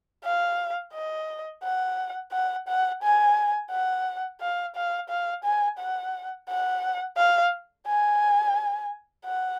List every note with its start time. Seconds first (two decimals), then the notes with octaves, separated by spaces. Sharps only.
0.24 F5
0.93 D#5
1.63 F#5
2.32 F#5
2.68 F#5
3.02 G#5
3.70 F#5
4.41 F5
4.75 F5
5.09 F5
5.44 G#5
5.79 F#5
6.49 F#5
7.17 F5
7.86 G#5
9.25 F#5